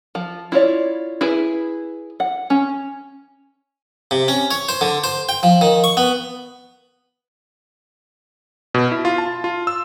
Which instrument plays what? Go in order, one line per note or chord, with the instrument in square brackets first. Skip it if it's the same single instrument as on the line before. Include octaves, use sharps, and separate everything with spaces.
[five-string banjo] F3
E4 F4 C#5 D5
E4 G#4 B4
F#5
C#4
[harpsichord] C3
C#4
C#5
C5
D3
C5
G5
F3
D#3
C#6
B3
[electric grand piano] B2
E4
F4
A5
F4
E6